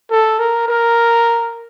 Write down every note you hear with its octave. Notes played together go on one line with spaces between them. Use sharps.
A4
A#4
A#4